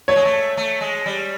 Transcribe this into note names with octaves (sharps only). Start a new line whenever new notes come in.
A3 C#5
G#3
A3
A3
G#3
G3